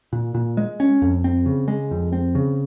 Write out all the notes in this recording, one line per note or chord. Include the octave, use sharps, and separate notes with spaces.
A#2
A#2
G#3
C#4
F2
C4
C#3
G#3
F2
C4
C#3